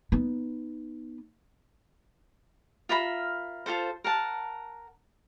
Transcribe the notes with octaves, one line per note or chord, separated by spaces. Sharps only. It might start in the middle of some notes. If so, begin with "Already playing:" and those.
B3 D#4
F4 A#4 E5 B5
F4 F#4 A4 C5
A#4 F#5 A5